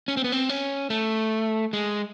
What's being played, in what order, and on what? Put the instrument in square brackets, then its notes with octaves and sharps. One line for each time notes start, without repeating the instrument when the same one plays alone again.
[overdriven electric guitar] C#4
C4
B3
C4
C#4
A3
G#3